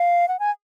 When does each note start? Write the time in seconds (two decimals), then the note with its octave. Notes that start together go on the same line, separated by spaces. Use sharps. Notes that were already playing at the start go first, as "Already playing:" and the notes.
Already playing: F5
0.28 F#5
0.39 G#5